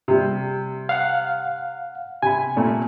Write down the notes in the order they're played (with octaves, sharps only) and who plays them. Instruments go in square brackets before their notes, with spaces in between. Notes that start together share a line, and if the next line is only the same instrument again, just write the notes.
[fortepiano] C3 G3
[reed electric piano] F5 F#5
[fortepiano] C3 B5 [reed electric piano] G#5
[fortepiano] A#2 A3